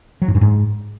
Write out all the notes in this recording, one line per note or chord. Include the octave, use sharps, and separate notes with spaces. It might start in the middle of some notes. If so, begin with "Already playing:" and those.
F#3
G#2
G2
G#2